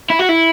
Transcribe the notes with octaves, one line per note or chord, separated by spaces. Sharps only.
E4
F#4
E4